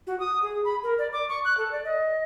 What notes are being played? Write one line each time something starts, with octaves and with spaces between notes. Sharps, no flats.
F#4
D#6
G#4
B5
A#4
D5
D6
C#6
F#6
A4
D5
D#5